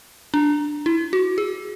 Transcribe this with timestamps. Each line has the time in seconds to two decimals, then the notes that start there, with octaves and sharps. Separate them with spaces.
0.34 D4
0.86 E4
1.13 F#4
1.38 G#4